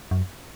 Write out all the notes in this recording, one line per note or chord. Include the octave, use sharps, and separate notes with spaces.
F#2